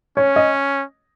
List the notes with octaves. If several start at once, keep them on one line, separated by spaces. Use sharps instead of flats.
C#4 C#5
D#5